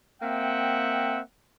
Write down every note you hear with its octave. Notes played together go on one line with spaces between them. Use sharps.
A#3 C4 E5 F#5 G5